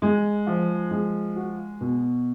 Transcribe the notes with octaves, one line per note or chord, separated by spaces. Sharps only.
G#3
F3
G#3
F#4
B2